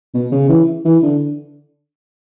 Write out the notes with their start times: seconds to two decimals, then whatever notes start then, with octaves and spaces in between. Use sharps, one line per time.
0.14 B2
0.32 C#3
0.49 E3
0.85 E3
1.03 D3